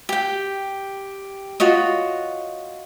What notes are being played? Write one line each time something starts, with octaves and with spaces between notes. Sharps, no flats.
G4 G5
F4 F#4 C#5 D#5